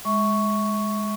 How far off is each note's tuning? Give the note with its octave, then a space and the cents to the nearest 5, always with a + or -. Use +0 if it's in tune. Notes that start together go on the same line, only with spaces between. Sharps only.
G#3 +0 E5 -25 C#6 +5